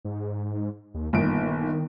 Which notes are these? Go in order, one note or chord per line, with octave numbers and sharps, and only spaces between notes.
G#2
D#2
G1 A#2 D#3 D7